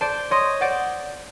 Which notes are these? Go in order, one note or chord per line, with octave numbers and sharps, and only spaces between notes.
C5 D5 A5
C#5 D#5 C6
C5 D5 F#5